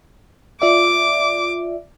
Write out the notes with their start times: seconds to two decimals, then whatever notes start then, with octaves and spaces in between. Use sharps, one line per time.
0.62 F4 D5 E5 D6